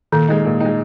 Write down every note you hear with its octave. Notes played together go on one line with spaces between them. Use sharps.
A#2 D#3
G#3 D#4
A#2
G#3 D#4